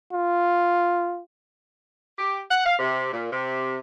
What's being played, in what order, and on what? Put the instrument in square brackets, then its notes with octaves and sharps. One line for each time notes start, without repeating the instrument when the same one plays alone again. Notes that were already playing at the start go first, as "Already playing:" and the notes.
[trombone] F4
[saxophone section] G4
F#5
F5
C3
A#2
C3